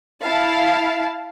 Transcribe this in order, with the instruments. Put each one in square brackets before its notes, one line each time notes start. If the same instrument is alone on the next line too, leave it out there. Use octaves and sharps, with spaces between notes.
[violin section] E4 F5 A5